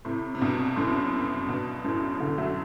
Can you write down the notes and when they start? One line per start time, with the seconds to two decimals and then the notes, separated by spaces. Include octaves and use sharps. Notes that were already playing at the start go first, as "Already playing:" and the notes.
0.05 A2 C3
0.35 C3
0.41 G2 B2
0.76 F#2 A2
1.49 G2 B2
1.84 F#2 A2
2.20 B2 D3
2.37 F#3 A3